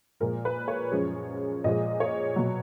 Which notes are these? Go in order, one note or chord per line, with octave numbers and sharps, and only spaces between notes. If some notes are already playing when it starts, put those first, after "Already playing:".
A#2 F3 G#3 A#4
B4
C#5
F#2 F3 G#3
A#2 F3 G#3 D#5
C#5
B2 F#3